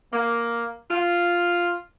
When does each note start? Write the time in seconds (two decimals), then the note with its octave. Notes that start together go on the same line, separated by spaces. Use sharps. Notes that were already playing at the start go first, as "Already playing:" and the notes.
0.13 A#3
0.91 F4